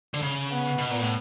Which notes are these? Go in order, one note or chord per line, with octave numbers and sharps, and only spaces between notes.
D3
C#3
B3
B2
A#2
A2